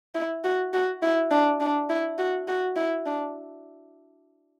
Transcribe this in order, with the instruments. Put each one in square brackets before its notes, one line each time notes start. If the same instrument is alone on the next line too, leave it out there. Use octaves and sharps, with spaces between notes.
[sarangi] E4
F#4
F#4
E4
D4
D4
E4
F#4
F#4
E4
D4